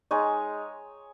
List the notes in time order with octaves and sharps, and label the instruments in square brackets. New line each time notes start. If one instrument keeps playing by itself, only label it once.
[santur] G#3 D#4 C#5